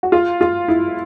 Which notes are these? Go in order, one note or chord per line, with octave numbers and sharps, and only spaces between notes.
F#4
F4
F4
E4